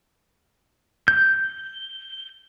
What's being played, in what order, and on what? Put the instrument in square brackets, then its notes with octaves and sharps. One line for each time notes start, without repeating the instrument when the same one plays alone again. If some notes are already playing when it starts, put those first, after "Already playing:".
[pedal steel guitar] G6